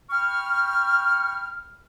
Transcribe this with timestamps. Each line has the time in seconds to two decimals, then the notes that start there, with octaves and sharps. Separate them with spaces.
0.10 G5 B5 C#6 F6